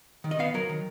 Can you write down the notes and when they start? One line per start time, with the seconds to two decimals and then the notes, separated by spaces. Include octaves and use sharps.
0.24 D#3
0.31 D#5
0.39 B3 F5
0.54 F#3 A#4
0.69 D#3